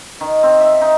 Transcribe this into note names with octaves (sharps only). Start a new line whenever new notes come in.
D#3
C4
E5
D#4